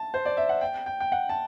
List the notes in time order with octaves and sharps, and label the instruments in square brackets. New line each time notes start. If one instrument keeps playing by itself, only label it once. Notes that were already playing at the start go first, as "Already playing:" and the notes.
Already playing: [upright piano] A5
C5
D5
E5
F#5
G5
G5
G5
F#5
A5